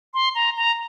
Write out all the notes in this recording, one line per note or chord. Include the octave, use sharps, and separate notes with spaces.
C6
A#5
A#5